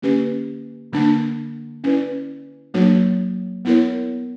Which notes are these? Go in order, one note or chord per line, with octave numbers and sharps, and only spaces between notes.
D3 A#3 C#4 G4 B4
D3 A#3 D4
C#4 E4 B4 D5
F#3 A#3 D4 F#4 C#5
B3 E4 A#4 C#5